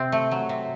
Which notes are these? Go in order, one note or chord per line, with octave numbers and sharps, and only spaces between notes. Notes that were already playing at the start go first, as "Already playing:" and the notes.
Already playing: C3 C4
A3
F#3
C3